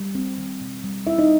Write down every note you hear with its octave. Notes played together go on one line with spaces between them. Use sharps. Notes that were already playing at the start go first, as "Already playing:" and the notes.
Already playing: G3
C4
D#3
B2
G3
C4 E4 E5
D#4 D#5